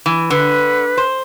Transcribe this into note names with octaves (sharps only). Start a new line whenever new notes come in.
E3
D3 B4
C5